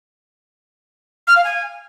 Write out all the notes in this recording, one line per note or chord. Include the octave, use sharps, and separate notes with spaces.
F6
F5
G#5